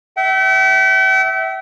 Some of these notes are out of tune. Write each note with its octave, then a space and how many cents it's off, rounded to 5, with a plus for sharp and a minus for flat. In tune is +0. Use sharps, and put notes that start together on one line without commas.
E5 -10 G5 -45